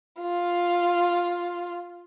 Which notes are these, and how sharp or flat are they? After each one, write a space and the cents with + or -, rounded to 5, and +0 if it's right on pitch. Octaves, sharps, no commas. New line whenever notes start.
F4 +5